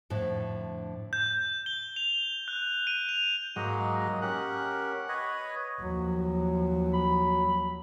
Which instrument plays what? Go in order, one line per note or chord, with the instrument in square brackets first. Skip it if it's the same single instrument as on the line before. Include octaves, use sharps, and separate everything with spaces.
[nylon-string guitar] F2 A2 D3
[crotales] G6
G7
F7
F#6
D#7
F7
[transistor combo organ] G#2 F#3 [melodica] A#3 D#4 D#5
[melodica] C#4 G4 A#4 [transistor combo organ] F#5
[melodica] B4 C#5 D#5
[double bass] D#2 F3 [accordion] F#3
[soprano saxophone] B5